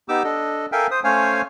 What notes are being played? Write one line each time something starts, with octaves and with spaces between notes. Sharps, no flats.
B3 D#4 G4 D6 E6
D4 A4 D#5
A4 A#4 E5 F5 G5 G#5
C5 D#6
A3 C#4 C5 C#5 F5 G#5